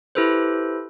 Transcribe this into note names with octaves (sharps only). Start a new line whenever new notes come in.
E4 G4 A4 B4 C5